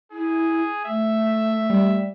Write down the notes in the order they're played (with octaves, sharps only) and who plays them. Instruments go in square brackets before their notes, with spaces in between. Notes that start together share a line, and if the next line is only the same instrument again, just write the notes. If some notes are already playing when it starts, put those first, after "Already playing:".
[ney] E4 [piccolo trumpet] G#4
[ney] A3 [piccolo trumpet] E5
[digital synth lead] G3